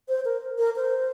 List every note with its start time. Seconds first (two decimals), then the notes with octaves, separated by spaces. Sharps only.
0.08 C5
0.25 A#4
0.58 A#4
0.76 C5